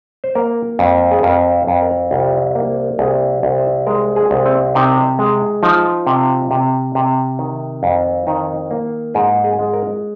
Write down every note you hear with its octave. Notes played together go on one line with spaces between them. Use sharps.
C5
A#3 A#4
F2
G#4
F2 A#4
C5
F2
A#4
C2 F4
A#3
C2 G#4
C2
C5
G#3 A#4
G#4
C2
C4
C3 D#4
G#3
F3 D#4
C3
C3
C3
D#3
F2
D#3 D#4
A#3
G#2 G#4
G#4
G#3
A#4